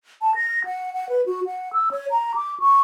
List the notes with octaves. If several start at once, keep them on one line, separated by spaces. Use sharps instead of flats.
A5
A#6
F#5
F#5
B4
F#4
F#5
E6
C#5
A#5
D6
C#6